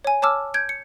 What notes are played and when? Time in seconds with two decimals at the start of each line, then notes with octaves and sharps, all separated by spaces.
0.05 C#5 G#5
0.22 C#5 A5 D6 E6 F6
0.54 G6 G#6 D7
0.69 C#7